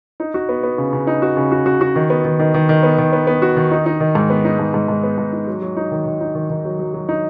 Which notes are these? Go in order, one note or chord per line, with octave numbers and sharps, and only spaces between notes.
D#4
F#4
B3
B3
C#3
C#3
D#4
F#4
C#3
F#4
F#4
F#4
D#3
B3
D#3
D#3
D#3
D#3
B3
D#3
B3
B3
F#4
D#3
D#4
D#4
D#3
G#2
B3
D#4
G#2
G#2
G#2
B3
G#2
D#4
F#3
F#3
D#4
D#3
D#3
D#4
D#3
D#3
F#3
F#3
F#3
D#4